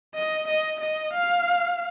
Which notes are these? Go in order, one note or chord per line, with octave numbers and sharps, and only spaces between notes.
D#5
D#5
D#5
F5